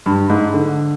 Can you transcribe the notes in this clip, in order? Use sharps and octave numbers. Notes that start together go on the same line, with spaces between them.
G2
G#2
D3